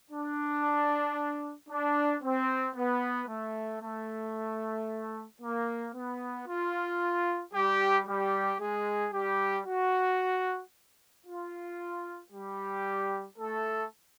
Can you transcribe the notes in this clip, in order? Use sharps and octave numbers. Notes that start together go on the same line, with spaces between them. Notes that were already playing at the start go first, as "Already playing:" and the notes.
D4
D4
C4
B3
A3
A3
A#3
B3
F4
G3 G4
G3 G4
G#3 G#4
G3 G4
F#4
F4
G3 G4
A3 A4